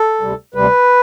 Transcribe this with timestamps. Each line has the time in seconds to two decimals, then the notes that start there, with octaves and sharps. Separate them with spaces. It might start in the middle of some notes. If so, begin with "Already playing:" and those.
Already playing: A4
0.21 D2 C3 G3
0.54 D2 C3 G3 B4